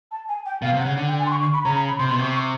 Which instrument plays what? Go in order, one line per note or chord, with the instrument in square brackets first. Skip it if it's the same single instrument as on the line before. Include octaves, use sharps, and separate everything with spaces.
[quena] A5
G#5
G5
[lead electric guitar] B2 [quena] F5
[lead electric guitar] C3
[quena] F#5
[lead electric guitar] C#3
[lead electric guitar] D3 [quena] F#5
[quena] G5
G#5
C6
C#6
C#6
B5
[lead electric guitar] C#3 [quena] A#5
[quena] A#5
B5
[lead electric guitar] C3 [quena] C6
[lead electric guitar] B2 [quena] C6
[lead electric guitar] C3 [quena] C#6
[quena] C#6